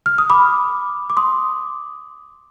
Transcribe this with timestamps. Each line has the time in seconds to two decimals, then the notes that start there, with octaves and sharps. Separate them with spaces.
0.06 F6
0.18 D#6
0.30 B5 D6
1.10 D6
1.17 C6 D#6